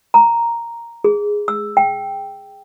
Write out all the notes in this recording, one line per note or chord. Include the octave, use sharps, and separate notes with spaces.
A#5
G#4
E6
G5